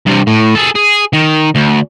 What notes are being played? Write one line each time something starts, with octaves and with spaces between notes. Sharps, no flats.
G2 C3
A2
G#4 A4
G#4
D#3
D2